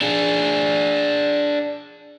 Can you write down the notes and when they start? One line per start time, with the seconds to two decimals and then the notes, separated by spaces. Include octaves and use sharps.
0.01 D4 G#4